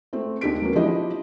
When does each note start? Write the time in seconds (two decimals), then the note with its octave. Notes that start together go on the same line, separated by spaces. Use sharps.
0.13 A3 C4
0.41 D#2 D4 G4 B6 D7
0.62 F#3 A#3 B3 C#4 F#4
0.75 F3 D4 E4 G4 D#5